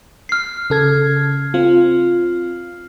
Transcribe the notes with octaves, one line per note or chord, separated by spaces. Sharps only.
F6 C7
C#3 A4 G#6
C4 F4